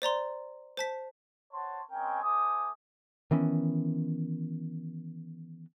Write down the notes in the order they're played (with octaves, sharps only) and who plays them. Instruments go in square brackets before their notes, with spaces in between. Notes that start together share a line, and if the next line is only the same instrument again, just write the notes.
[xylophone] C5 D5 A#5 C6
C5 A5 B6
[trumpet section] C5 C#5 F#5 A5 C6
G#3 C4 C#4 A#4 G5 G#5
A3 C5 G#5 D6 D#6
[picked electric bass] D#3 E3 B3 C#4